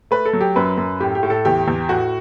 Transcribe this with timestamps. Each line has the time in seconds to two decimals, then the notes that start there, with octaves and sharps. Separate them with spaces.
0.11 A3 B4
0.25 A4
0.34 F#3
0.41 G4
0.56 F#2 B4
0.78 F#2
1.00 A2 G4
1.15 G4
1.23 A2
1.30 A4
1.45 E2 G4
1.68 E2
1.89 A2 F#4